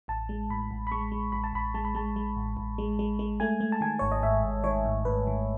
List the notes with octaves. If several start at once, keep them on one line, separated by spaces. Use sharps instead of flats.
A1 A5
G#3
A2 B5
A1
B5
G#3 C#6
G#3
A1 B5
A5
A1 B5
G#3 A5
B5
G#3 A5
G#3
A1
A1
G#3
G#3
G#3
A3 G#5
A3
A5
D#3 G#5
G#1 C#5
D#5
G#2 E5
G#1
D#3 C#5
G#2
G#2 B4
D#3